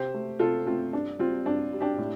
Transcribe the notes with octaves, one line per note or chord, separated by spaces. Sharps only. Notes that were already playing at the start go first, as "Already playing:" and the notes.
Already playing: C3 G4 C5
A3
C3 F4 A4
A3 C4 F4
G2 D4
G3 C4 F4
G2 D4
G3
D4 G4
A2